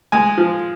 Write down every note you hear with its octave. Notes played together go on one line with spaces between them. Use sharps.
G#3 G#5
F3